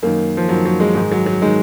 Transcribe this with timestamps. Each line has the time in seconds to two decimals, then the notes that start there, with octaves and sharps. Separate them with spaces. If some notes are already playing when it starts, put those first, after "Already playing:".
0.03 F#2 D#3 A#3
0.37 F3
0.49 F#2 D#3 F#3
0.65 F#3
0.80 G#3
0.95 G#2 D#3 G#3
1.11 F#3
1.26 F#3
1.42 D#3 G#3